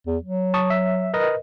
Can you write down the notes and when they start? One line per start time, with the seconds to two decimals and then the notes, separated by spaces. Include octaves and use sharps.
0.07 E2
0.23 F#3
0.54 A5 C#6 D#6
0.70 E5
1.14 A#4 B4 D#5